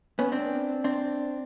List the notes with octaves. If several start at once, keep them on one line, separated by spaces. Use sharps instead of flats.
B3 C#4
C4 D4
C4 D4